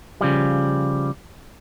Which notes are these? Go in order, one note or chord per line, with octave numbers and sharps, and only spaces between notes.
C#3 F3 G3